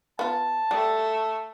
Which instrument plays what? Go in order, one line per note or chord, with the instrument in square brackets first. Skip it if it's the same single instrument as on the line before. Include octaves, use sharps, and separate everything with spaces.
[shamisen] B3 F4 [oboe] A5
[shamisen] G3 [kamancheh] A3 A4